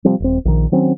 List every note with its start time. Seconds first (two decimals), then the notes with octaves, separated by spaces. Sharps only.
0.05 C3 F3 G3 C4
0.20 D#1 C4
0.45 A#1 D#3
0.72 D#3 F#3 C4 C#4